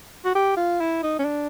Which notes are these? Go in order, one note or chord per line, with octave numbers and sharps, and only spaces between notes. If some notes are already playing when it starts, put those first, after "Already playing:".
F#4
G4
F4
E4
D#4
C#4
D4